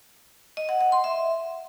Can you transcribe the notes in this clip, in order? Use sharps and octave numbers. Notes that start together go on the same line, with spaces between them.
D#5
F#5
F#5
C6
E5